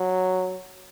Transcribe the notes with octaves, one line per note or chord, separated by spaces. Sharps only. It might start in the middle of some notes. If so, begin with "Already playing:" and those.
Already playing: F#3